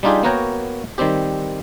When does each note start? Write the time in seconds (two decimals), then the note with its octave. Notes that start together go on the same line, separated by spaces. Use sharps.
0.03 G3 D4 D#4 F4 G4 G#4
0.23 A#3 B3 F#4 A#4 C#5 G5
0.98 D#3 G3 C4 G4